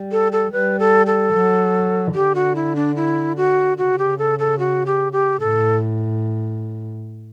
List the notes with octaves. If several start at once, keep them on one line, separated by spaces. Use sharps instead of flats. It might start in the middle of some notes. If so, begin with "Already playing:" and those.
Already playing: G3
A4
A4
G3 B4
A4
A4
F#3
D3 G4
F#4
E4
D4
E4
F#4
C#3 F#4
G4
A4
A4
F#4
G4
G4
A2 A4